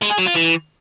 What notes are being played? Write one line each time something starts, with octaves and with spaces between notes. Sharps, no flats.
G#3
G#4
F#3
F4
E3